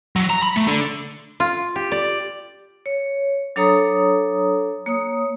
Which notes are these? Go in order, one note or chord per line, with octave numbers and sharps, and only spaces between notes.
F#3
A#5
B5
A3
D3
F4
G4
D5
C#5
F#3 D4 A4 C#5 A#5 D#6
A#3 C#5 D#6